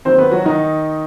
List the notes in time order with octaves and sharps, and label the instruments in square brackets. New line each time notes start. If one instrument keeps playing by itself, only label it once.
[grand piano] D#2 D#3 F#3 C4 C5
B3 B4
F#3 F#4
D#3 D#4